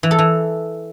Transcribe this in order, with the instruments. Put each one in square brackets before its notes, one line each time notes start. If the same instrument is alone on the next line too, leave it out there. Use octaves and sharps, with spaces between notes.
[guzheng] E3
A4
E3